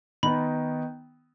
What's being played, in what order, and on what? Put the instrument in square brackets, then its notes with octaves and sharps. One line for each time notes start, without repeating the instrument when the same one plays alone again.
[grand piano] D#3 B3 D#4 [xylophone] B5